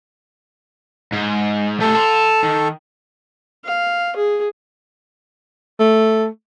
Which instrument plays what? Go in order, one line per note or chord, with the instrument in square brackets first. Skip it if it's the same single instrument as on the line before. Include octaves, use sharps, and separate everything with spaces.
[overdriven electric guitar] G#2
[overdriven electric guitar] A3 G4 [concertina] A4
[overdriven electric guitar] A5 C6
D#3
[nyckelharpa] F5
G#4
[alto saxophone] A3